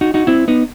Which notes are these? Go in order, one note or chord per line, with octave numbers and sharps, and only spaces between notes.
D#4 F#4
D#4 F#4
C4 E4
B3 D#4